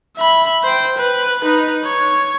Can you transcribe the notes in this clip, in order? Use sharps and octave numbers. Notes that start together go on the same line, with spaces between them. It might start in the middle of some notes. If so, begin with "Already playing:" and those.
E5 B5
C5 G5
B4
D#4 B4
C#5